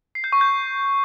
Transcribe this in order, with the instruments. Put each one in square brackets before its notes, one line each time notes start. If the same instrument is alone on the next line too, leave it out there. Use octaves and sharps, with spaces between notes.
[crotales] C7
G6
C#6
G6